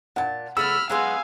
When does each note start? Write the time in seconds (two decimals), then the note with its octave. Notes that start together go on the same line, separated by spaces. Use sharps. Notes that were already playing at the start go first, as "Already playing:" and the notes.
0.16 A#2 F#5 A5
0.57 C#3 A3 B3 B5 E6 F6
0.90 F#3 G#3 B3 F5 G#5